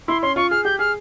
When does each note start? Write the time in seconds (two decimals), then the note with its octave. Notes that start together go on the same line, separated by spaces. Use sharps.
0.08 E4 C6
0.22 C#4 C6
0.36 F4 C#6
0.50 G#4 F6
0.65 G4 G6
0.79 G#4 F6